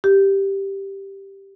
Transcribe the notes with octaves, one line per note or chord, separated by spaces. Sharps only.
G4